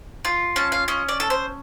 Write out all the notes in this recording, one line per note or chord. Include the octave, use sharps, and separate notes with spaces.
F4
C#4 A5
F5
C#4 D#5
D5
A4
C5